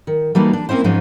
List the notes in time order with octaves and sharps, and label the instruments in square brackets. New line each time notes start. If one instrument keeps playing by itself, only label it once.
[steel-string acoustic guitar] D#3
E3 G3 A3 A#3 D#4 F#4
D4
A#3 C4 C#4 E4 C5
G#2 F3 G#3 C#4 D#4